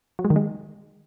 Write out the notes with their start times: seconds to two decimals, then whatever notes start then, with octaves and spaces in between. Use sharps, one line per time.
0.19 F#3
0.25 G#3
0.30 D#3
0.36 G#3